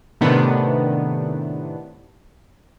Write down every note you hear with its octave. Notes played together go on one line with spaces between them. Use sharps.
A2 C3 D#3 B3 D4